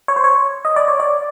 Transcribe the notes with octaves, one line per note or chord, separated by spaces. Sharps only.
C#5
C5
C#5
D#5
D5
C#5
D5